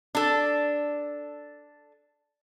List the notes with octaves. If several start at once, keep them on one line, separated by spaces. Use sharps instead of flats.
D4 A4